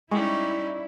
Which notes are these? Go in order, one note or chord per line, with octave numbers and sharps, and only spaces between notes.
G3 G#3 C#4 D#4 E4 D5 G5 C#6